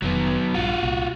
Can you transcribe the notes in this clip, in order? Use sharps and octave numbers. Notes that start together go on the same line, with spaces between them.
F1 F2 D#3 F#3 B3
A#1 G2 F4 F#4
C2 A#2